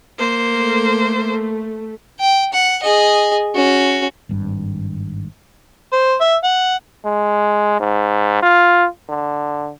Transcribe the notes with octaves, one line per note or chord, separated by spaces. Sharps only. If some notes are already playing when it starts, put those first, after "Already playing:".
A#3 C5
A3
G5
F#5
G#4 D#5
C#4 F#4
G#1 G2
C5
E5
F#5
G#3
G#2
F4
D3